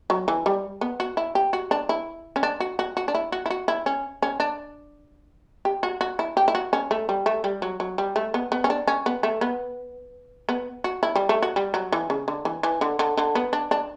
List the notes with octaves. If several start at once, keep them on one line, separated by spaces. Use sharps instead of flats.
F#3
E3
G3
B3
F#4
E4
G4
F#4
D4
E4
C#4
D4
F#4
F#4
F#4
D4
E4
F#4
E4
F#4
E4
C#4
C#4
D4
G4
F#4
F#4
E4
G4
E4
F#4
C#4
A3
G3
A3
G3
F#3
F#3
G3
A3
B3
B3
C#4
D4
C#4
B3
A3
B3
B3
F#4
E4
G3
A3
F#4
G3
F#3
E3
C#3
D3
E3
E3
D3
D3
D3
B3
D4
D4